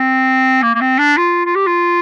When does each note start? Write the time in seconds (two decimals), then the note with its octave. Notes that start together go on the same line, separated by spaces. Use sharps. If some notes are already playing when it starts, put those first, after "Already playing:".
Already playing: C4
0.62 A#3
0.75 A#3
0.81 C4
0.99 D4
1.17 F4
1.45 F4
1.56 G4
1.67 F4